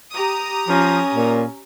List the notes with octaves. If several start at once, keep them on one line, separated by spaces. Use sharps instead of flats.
G4 A#5 D#6
F3 C#4
A#2